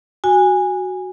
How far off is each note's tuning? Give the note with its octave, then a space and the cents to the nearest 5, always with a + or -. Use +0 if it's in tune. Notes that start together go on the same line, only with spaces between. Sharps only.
F#4 +0 G#5 -15